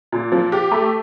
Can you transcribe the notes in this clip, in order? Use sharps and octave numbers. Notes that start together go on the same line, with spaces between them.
A#2
F3
G4
A3